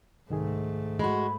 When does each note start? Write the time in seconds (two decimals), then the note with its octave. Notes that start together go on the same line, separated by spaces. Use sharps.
0.30 C2 G#2 D#3 A3 G#4
0.99 G#3 F#4 B5